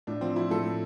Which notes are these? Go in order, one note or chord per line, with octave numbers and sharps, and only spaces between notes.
A2 D4
F3 C4
F3 E4
A2 A4
A2